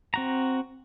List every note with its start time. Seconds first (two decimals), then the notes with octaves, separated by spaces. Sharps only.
0.14 C4 F#4 A#5